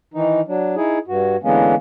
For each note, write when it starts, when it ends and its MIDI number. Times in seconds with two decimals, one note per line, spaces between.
0.14 0.41 51
0.14 0.41 52
0.14 0.41 63
0.47 0.76 54
0.47 0.76 62
0.76 0.99 63
0.76 0.99 64
0.76 0.99 68
1.08 1.37 43
1.08 1.37 66
1.43 1.75 50
1.43 1.75 52
1.43 1.75 56
1.43 1.75 58
1.43 1.75 59
1.43 1.75 61